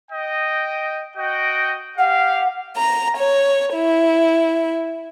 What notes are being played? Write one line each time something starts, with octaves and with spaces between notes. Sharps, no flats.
D#5 G5
F#4 D#5 G5
G4 F5 F#5
A#5
C#5
E4